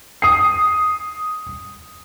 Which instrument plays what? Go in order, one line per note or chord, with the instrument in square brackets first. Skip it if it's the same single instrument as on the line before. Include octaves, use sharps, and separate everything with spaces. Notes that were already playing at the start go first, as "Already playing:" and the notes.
[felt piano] D#6 C7